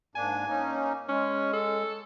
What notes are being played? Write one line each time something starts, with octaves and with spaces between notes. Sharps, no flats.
G#2 A#3 D4 G#5
A#3 C#4 D#4
G#3 C#4
A4